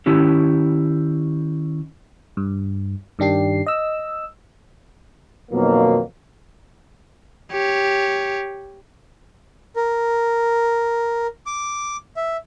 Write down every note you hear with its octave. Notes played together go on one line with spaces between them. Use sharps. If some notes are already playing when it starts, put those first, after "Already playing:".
D#3 C#4 E4 G4
G2
G2 D#3 D4 G4 C7
D#5 E6
B1 F2 B2 D#3 F#3 A#3
G4 C#5
A#4
D6
E5